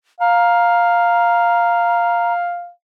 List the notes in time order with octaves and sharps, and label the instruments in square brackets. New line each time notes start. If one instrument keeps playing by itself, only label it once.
[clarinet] F5 [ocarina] A#5